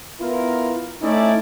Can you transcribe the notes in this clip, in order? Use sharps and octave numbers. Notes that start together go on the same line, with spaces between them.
B3 E4 F4 A#4
A3 C#4 D#4 E4 D5